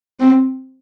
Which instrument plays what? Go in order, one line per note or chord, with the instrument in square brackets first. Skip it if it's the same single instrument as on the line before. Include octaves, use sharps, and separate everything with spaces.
[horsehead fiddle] C4